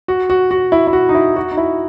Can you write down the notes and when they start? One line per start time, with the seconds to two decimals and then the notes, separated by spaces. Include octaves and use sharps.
0.08 F#4
0.30 F#4
0.51 F#4
0.72 E4
0.87 E4
0.93 F#4
1.09 D#4
1.15 E4
1.36 F#4
1.51 D#4
1.57 E4